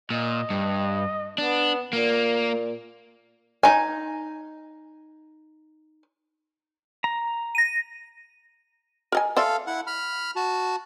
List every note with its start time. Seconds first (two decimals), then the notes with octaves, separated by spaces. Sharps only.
0.10 A#2 D#5
0.50 G2
1.38 B3 D4
1.93 A#2 A#3
3.63 D#4 G#5
7.04 A#5
7.55 A#6 D#7
9.12 A#4 D#5 G#5
9.36 A4 C5 D5 E5 F5
9.67 E4 F#5
9.87 B5 F6
10.36 F#4 A5